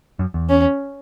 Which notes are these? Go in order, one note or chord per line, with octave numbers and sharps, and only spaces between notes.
F#2
E2
C#4